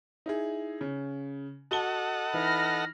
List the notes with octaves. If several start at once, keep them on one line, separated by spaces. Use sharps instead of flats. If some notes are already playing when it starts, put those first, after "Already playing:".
D#4 E4 G#4
C#3
F#4 A4 D#5 F#5 A5 G7
E3 D#4 B5 F6 A#6